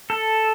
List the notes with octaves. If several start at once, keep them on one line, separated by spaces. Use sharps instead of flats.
A4